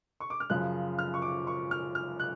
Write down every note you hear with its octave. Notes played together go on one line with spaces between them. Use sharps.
C#6
D6
F6
F#2 C#3 F3 F#6
F6
C#6
D6
C#6
F6
F6
F#6